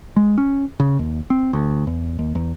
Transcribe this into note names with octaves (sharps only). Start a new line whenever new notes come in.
G#3
C#4
C#3
D#2
C4
D2
E2
D#2
E2